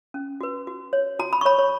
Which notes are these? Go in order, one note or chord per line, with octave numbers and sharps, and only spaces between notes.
C#4
F#4 B4
F#4
C#5
F#4 A#5
B5
C#6
C#5 B5
C#5